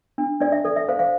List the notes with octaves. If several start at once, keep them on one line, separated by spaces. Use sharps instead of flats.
D4
D4 D5
E5
A4 D5
E5
C5 F5
F5